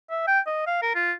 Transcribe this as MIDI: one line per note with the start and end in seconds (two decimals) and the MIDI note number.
0.10 0.26 76
0.28 0.40 79
0.47 0.65 75
0.67 0.78 77
0.82 0.91 70
0.95 1.13 65